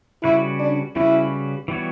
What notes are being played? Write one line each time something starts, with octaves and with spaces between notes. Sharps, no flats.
C#3 G3 C#4 E4 F#4 B4
D4
C#3 G3 C#4 E4 F#4 B4
E3 G3 B3 F#4 C#5